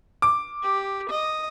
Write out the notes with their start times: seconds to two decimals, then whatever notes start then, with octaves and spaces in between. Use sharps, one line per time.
0.22 D6
0.63 G4
1.10 D#5